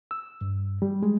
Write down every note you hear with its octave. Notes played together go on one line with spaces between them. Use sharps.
E6
G2
G3
G#3